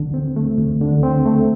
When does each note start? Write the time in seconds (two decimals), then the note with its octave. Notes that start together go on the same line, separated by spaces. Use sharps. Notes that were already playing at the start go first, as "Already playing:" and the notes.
Already playing: D2 D3
0.14 C4
0.36 A3
0.58 D2
0.81 D3
1.03 C4
1.25 A3